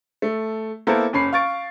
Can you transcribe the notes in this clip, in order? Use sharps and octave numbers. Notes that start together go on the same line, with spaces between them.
A3
A#3 B3 E4 A4 A#4 C5
F#1 C#4 B5 C7
F5 C#6 A6 D7